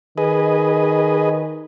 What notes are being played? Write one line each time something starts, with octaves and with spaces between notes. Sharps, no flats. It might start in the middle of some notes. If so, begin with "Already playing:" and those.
D#3 G#4 B4 D#5